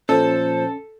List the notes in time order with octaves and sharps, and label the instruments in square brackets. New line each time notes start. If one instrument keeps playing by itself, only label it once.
[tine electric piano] A#2 F3 [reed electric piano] C#4 [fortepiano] A4 [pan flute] C5